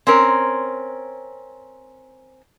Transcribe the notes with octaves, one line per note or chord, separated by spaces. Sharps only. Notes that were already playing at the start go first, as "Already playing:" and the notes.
C4 C#4 A#4